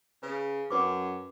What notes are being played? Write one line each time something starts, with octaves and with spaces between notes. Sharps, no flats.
C#3 B4
F#2 C#4 B4 D6